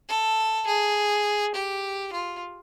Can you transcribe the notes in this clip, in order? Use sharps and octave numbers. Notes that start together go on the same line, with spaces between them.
A4
G#4
G4
F4